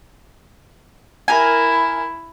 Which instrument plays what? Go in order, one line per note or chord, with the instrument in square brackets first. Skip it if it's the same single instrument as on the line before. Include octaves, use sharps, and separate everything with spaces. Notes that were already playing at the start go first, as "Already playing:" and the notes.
[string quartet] E4 [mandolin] A#4 G#5